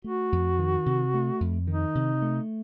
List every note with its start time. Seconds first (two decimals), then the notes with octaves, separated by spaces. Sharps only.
0.04 A3 F#4
0.32 F2
0.59 D#3
0.86 C3
1.14 A3
1.40 F2
1.67 D#3 D#4
1.95 C3
2.22 A3